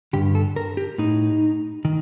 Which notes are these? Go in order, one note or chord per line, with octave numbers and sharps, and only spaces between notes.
G2 D3 G4
A4
A#4
G4
A2 D#4
D#3